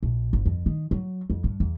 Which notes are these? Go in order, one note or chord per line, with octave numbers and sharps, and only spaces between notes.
A#1
G1
F2
D#3
F#3
F2
G2
E2